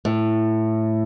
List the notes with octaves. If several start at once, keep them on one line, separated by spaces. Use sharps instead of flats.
A2